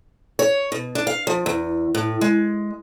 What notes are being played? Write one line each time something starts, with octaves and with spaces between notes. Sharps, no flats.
C#5
B2
D4
F5
F3
E2
A2
G#3